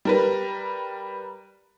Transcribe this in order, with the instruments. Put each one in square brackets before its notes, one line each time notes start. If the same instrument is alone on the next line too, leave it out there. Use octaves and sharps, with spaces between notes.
[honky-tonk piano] G3 A#4 B4